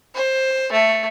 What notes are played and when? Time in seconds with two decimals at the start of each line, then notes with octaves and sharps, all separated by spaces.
0.15 C5
0.72 A3